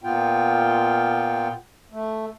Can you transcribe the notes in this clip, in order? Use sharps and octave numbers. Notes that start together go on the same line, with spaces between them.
A#2 B3 F4 G5
A3